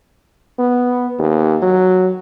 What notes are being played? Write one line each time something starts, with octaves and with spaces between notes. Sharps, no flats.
B3
D#2
F#3